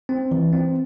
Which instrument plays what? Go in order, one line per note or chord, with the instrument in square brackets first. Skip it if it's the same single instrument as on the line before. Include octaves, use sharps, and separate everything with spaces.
[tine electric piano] C4
E3
C4